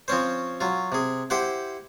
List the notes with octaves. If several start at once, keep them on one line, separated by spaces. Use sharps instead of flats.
F3 C4 C#4 C5
F#3 F4
C3 G#4
E4 G4 C5 F#5